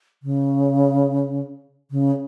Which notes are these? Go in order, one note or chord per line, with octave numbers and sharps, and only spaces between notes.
C#3
C#3